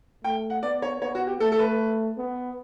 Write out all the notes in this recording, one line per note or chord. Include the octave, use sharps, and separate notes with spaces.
A3 G5
F#5
B3 D5
C#5
B3 C#5
F#4
G4
A3 A4
A4
B4
B3